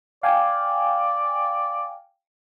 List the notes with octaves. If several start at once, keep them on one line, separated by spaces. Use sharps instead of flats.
D5 F5 G5 G#5